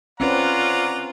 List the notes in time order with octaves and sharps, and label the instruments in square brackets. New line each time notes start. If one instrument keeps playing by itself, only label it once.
[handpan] C4 C#4 B4 [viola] F4 [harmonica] D5 F#5 A#5